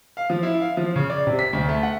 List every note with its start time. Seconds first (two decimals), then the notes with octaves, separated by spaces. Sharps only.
0.17 F5
0.30 F3
0.43 E4
0.60 F5
0.77 F3
0.96 C#3
1.10 D5
1.27 C3
1.39 B6
1.53 D2
1.68 A3
1.83 F#5